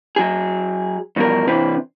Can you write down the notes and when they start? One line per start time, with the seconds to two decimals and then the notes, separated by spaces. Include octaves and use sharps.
0.16 F#3 G#4
1.16 E2 G2 B2 F3 A#4
1.47 C3 E3 C4 D4 B4